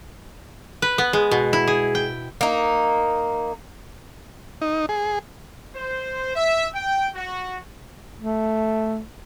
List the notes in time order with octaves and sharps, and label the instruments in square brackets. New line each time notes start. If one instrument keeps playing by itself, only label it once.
[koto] B4
B3
G#3
B2
E4
G#4
G5
[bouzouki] A#3 D#4
[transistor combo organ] D#4
G#4
[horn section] C5
E5
G5
F#4
[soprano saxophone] A3